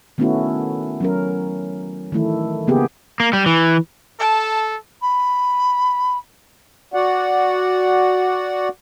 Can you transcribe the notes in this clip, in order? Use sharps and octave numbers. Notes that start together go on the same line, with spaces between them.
D#3 A3 B3 C#4 E4 F#4
F#3 C#4 A#4
D#3 E3 A3 E4
C#3 A#3 B3 G4 G#4
A#3
G3
E3
A4 A5
B5
F#4 D5 F#5